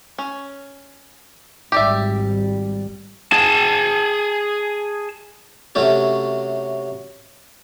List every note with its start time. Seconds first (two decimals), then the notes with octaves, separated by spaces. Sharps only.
0.18 C#4
1.72 G#1 G3 G4 D5 E5
3.32 G#4 A5
5.75 C3 F#3 A3 C#4 A4